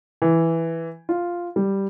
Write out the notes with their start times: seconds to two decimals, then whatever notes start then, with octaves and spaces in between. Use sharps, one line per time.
0.22 E3
1.09 F4
1.56 G3